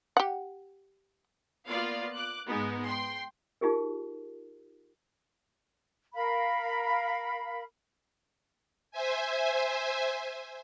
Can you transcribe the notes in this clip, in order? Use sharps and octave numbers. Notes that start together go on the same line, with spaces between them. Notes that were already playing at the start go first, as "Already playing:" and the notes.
G4 F#5
A#3 B3 F4 D5 F5
D6 F#6
G#2 G#3 B3 D#4
G5 C6
D#4 F4 G4 G#4 A#4
A#4 F5 B5
C5 E5 G#5